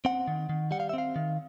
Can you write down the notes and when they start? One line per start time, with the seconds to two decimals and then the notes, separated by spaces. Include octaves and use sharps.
0.05 C4 F#5
0.27 D#3
0.49 D#3
0.71 G3 F#5
0.80 F5
0.89 E5
0.94 C4 F5
1.16 D#3